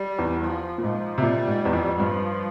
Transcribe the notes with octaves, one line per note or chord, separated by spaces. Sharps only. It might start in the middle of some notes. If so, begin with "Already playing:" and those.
Already playing: G3
E2
F3
A#2
G#2 F3
C3
A#2 G3
G#2
E2
F2
G2 F3